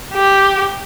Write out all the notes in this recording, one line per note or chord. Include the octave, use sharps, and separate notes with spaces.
G4